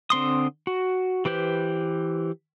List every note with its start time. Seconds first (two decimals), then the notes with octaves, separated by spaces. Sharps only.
0.10 D3 C4 C6 D#6
0.67 F#4
1.25 E3 G4 B4 C5